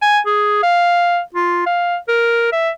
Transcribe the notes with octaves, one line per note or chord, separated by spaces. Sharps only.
G#5
G#4
F5
F4
F5
A#4
E5